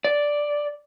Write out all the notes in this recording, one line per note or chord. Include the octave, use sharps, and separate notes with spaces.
D5